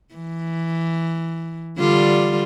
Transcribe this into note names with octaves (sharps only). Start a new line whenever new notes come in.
E3
D3 G3 F4